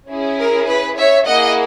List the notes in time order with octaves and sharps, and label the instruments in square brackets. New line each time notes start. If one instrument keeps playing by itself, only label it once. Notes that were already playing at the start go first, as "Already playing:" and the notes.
[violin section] C#4 E4 G#4
A#4
B4
C#5 E5
A#3 E4 G#4 D#5 F#5